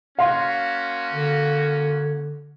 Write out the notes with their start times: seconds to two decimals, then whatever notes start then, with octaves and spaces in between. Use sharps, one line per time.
0.19 A#3 C#4 F#4 F5 C6
1.12 D3